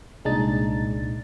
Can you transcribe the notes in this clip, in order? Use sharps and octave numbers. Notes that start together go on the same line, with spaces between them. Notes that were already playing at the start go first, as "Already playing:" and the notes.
C2 A#2 G#3 D4 D#4 A6